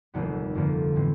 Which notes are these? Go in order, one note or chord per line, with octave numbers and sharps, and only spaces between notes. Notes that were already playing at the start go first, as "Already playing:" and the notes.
F1 D#2 D#3 G3 B3
G1 F2 D3 F3 A#3
A2 E3 G3 C4